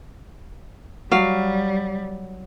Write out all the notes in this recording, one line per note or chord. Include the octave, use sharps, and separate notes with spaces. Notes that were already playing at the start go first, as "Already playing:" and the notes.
F#3 G3 F5